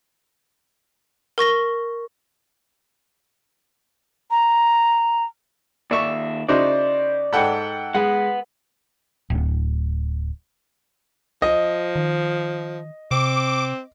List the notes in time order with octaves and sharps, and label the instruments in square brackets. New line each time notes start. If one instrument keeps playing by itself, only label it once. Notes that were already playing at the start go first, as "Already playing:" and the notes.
[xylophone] A#4 C#6 A#6 G7
[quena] A#5
[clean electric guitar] D#2 E5 [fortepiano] D5 C#6
[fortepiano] C#3 D#4 F#4 [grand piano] E4 C5 [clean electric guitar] D5
[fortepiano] G#2 B5 [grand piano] A4 F#5 G5
[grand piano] G#3 [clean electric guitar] B4 F#5
[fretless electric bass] D1
[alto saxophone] F3 [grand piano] D#5
[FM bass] D#3
[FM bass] C3 [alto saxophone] C4 [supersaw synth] D6